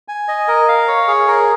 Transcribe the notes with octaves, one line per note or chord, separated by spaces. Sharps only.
G#5
D#5
A#4
F5
C#5
G#4
A#4